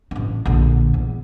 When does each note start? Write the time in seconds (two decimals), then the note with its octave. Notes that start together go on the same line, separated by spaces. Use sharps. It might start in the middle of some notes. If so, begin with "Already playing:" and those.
0.11 A1 D4
0.46 A#1 D3
0.94 E2